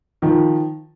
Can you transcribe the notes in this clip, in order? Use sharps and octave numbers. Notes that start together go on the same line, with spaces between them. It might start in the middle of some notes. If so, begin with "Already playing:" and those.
D#3 F3